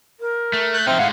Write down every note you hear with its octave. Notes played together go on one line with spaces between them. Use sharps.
A#4
A3
F#6 G6
F3 C4 D#4 E5 G5 F6
A2 G#3 F5 F#5